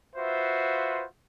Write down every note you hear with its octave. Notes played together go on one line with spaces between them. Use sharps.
F4 F#4 B4 C5 E5